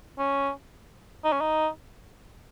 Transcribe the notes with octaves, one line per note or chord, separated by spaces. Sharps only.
C#4
D#4
C#4
D#4